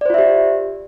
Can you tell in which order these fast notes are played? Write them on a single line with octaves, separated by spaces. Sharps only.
D5 C5 F4 E5 G4